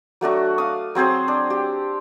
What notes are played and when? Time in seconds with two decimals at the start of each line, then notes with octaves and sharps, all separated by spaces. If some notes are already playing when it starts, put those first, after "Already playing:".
0.21 F#3 A3 D4 F#4
0.58 F5 D#6
0.95 F#3 C4 G#4 C5
1.28 D4
1.50 G4